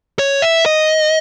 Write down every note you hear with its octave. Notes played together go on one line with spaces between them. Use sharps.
C#5
E5
D#5